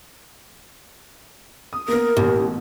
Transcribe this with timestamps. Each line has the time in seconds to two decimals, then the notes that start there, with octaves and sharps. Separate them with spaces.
1.73 D#6
1.88 A#3 B3 A#4
2.17 A1 D#2 B2